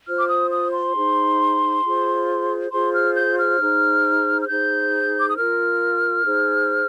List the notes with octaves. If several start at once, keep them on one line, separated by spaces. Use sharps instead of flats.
F4 C5 F6
D6
D#6
D#6
C6
D#4 G#4 C5
F4 G#4 C5
F4 G#4 C5 C6
F6
G6
F6
D#4 G#4 C5
F6
D#4 G#4 C5 G6
D6
D#6
F4 A#4 F6
D#4 G#4 C5